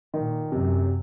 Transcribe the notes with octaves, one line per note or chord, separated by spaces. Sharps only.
A#2 D#3
F#2 C3